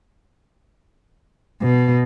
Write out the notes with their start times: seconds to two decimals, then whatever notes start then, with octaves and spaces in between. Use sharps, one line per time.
1.62 B2